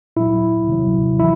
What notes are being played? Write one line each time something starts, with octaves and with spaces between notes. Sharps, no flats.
A#2 F#3 E4
C3 D#3 F#3
E3 E4